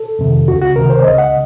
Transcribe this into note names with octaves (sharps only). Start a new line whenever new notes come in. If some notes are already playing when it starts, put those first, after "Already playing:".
Already playing: A4
F2 C3 D#3
C#2 C#3 F#4
F#4
C#2 C3 D#3 A#4
C5
C#5
C#2 C#3 D#5
F#5